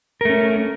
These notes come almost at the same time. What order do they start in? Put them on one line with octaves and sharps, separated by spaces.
A#4 A3 C#4